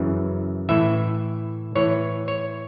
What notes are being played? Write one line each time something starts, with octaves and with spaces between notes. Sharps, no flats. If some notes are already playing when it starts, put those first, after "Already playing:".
Already playing: F#2 C#3 E3
A2 E3 E5
A2 E3 C#5
C#5